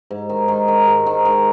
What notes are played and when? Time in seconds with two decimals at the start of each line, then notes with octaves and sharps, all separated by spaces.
0.11 G#2
0.29 D#3
0.48 D#3
0.68 D#3
0.87 G#2
1.06 D#3
1.25 D#3